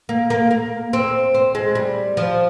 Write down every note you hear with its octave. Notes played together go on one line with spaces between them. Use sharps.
A#3
A#3
A#3
C4
C4
G#3
G3
F3